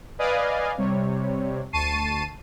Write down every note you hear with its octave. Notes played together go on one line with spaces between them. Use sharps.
B4 D5 D#5 F5 G#5
C3 G3 C#5
D2 A5 C#6 C7 D#7